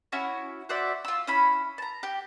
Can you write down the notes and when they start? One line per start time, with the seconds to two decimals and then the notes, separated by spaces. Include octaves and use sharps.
0.12 C#4 E4 F#4
0.69 F#4 C5 D5 E5
1.05 F4 E6
1.27 C#4 E4 B5
1.78 A5 A#5
2.03 G4